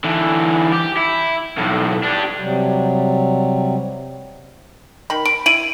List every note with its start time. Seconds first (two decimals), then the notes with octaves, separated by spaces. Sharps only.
0.04 D3 E3
0.72 G4
0.97 E4
1.58 B1 A2
2.03 D4 G4
2.39 C3 F#3 G3
5.10 D#3 B5
5.26 B5 D7
5.46 E4 D7 D#7 F#7